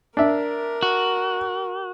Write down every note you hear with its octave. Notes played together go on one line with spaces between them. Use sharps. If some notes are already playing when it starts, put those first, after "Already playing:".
D4 A#4 E5
F#4